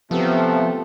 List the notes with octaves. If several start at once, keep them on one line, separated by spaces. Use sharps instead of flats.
C3 F3 A3 B3